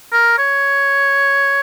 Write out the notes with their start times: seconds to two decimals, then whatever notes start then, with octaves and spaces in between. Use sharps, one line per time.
0.12 A#4
0.38 C#5